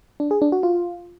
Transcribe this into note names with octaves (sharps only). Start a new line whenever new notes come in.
D4
G#4
D4
F#4
F4